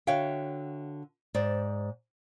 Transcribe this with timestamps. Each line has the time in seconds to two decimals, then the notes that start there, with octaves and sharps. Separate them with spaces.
0.07 D3 F#4 C#5 E5 F5 G5
1.34 G#2 C5 D5